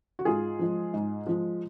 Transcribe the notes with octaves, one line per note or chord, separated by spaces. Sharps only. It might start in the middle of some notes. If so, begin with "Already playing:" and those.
F#4
G#2 F4 G#4
F3 G#3
G#2
F3 G#3